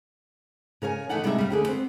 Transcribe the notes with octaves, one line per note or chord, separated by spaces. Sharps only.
C#3 A#4 C#5 G#5
E3 G#3 A3 D#4 D5 F#5
C3 G3 G#3 D4 D#4 E5
C#3 G3
D2 D3 G#4
B3 C4